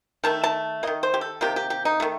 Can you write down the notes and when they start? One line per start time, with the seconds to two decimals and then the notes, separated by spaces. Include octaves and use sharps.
0.24 D#3 A3 A5
0.43 A5
0.83 D#3 A#3 D#5
1.03 C5
1.14 G4
1.21 A4
1.41 C3 D#3 A#3 G4
1.56 G4
1.70 G4
1.85 D#4
2.00 D#3 A3